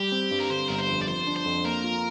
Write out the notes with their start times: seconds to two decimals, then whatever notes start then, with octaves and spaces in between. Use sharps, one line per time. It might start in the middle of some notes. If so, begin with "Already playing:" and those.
Already playing: G3 G4
0.12 C4
0.31 G2
0.40 A#4
0.50 D3 C5
0.68 G1 A#4
0.78 C5
0.89 F2
1.02 D5
1.07 F3 C5
1.27 D4
1.36 C5
1.46 F2
1.65 A#3 A#4
1.84 F4